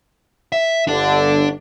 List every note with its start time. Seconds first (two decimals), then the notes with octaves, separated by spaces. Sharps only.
0.52 E5
0.87 G1 D3 D4 D5